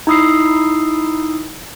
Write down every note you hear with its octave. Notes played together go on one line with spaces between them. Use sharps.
D#4 E4 D#6 E6 C7